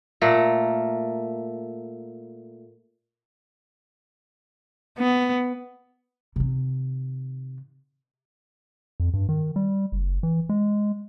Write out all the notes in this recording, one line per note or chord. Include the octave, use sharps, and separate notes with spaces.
A#2 A3 A#4
B3
C3 D#3
F2
G2
D#3
G3
F#1
E3
G#3